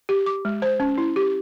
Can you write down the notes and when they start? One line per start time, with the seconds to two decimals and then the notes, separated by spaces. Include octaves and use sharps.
0.09 G4
0.26 D6
0.45 G#3
0.62 C5
0.80 C#4
0.98 E4
1.16 G4